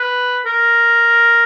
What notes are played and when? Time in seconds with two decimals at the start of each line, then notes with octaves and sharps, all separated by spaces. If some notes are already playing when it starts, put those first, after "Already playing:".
Already playing: B4
0.46 A#4